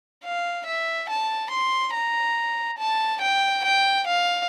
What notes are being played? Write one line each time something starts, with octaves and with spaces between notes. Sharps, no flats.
F5
E5
A5
C6
A#5
A5
G5
G5
F5